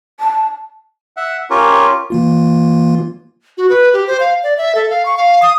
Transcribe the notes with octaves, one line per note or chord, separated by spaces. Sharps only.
A5
E5 F#5
C#4 F4 G4 A#4 C#5
E3 A#3 F4
F#4
B4
G4
C5
F5
D5
E5
A4
F5
C#6
F5
D#6